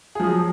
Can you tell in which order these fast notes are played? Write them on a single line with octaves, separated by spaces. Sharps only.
G#4 F3 F#3